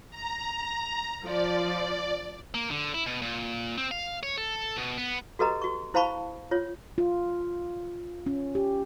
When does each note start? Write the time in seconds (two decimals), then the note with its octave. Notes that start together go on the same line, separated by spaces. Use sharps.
0.10 A#5
1.23 F3 D5
2.54 A#3
2.71 D3
2.94 E4
3.06 B2
3.22 A#2
3.78 C4
3.91 F5
4.23 C#5
4.38 A4
4.77 B2
4.98 B3
5.39 F#4 G4 A4 B4 D#5 A#5
5.62 F#4 C#6
5.94 E4 C5 F5 A5 B5 C#6
6.51 F4 C#5
6.98 F4
8.26 C#4
8.55 G4